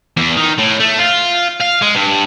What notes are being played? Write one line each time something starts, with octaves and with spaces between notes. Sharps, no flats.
E2
D#3
A2
A3
F4
F5
G#3
G2